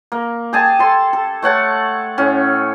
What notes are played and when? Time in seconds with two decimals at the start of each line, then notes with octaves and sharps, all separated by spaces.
0.12 A#3
0.53 G4 G#4 G#5 A5
0.79 A4 C6
1.13 A4
1.42 A3 C#5 F#5 A5
2.18 A2 C#4